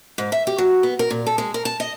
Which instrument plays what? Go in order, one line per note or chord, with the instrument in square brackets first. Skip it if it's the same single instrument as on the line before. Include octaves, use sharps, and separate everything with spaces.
[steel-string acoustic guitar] G#2
E5
G4
F#3
B3
A#4
A#2
A4
G#3
A#4
A5
D#5